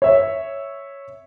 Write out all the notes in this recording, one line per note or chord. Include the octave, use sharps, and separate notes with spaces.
C#5 E5